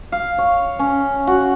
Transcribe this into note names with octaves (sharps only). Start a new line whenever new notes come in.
F5
C#5
C#4
F#4